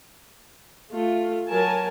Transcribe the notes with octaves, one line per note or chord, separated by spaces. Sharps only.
A3 F4
F#3 A#4 G#5 A5